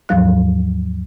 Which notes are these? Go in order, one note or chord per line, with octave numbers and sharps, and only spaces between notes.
D#2 G#2 F3 F#3 F5 F#6